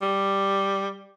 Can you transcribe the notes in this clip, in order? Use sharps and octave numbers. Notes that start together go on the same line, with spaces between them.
G3